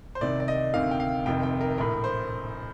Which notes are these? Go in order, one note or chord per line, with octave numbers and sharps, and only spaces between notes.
C5
C2 C3 D#3 D5
D5
D#5
D2 C3 D#3 F5
G5
F5
F1 F2 C3 D#3 G5
G5
A#4
A#1 A2 A#4
C5